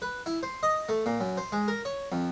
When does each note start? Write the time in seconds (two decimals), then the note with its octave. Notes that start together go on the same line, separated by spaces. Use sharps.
0.02 B4
0.26 E4
0.43 C5
0.63 D#5
0.89 A3
1.06 A#2
1.20 F#2
1.37 C5
1.52 G#3
1.68 A#4
1.85 C#5
2.12 F2